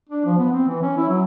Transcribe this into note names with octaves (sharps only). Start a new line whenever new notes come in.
D4
F3
B3
C4
E3
C#4
E4
F#3